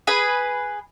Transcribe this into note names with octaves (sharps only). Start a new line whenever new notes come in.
G#4 B4 B5